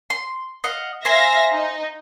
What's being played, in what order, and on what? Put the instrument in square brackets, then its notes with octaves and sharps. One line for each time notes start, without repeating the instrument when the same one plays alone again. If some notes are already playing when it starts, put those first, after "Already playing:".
[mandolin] C6
D#5 F5 F#5
[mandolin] C5 G#5 C6 [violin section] E5 F5 A#6
[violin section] D#4